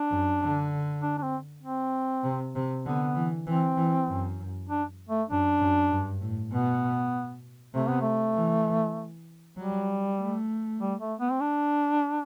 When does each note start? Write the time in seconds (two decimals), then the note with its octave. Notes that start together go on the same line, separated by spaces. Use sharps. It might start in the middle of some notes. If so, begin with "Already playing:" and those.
Already playing: D4
0.11 F#2
0.41 D3
1.02 D4
1.18 D4
1.22 C4
1.62 C4
2.24 C3
2.55 C3
2.85 D3 B3
3.15 E3
3.46 E3 C4
3.77 E3
4.07 F#2
4.69 D4
5.09 A3
5.30 F#2 D4
5.60 F#2
5.91 G2
6.21 A2
6.51 B2 B3
7.73 C3 A3
7.88 B3
8.01 A3
8.35 E3
9.57 F#3 G3
10.19 A3
10.80 G3
11.00 A3
11.20 B3
11.31 C4
11.41 D4